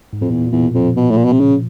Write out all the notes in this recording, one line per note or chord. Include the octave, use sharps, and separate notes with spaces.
G#2
F2 A2
E2 A#2
A#2
E2
B2
F2
F3
B2
A2
A#2
B2
C3
C#3